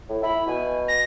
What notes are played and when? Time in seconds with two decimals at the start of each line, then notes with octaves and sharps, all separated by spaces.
0.10 A2
0.23 E4 B5
0.47 B2 G#5
0.88 A#6